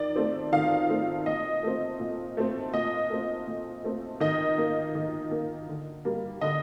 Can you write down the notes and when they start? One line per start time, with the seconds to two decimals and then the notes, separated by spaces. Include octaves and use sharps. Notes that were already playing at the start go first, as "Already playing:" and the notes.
Already playing: D#3 D5
0.16 A3 C4
0.52 D#3 F5
0.89 A3 C4
1.26 A#2 D#5
1.63 A3 C4
2.00 A#2
2.37 A3 C4
2.73 A#2 D#5
3.10 A3 C4
3.47 A#2
3.84 A3 C4
4.20 D#3 D#5
4.58 A#3
4.95 D#3
5.31 A#3
5.68 D3
6.05 G3 A#3
6.41 D3 D#5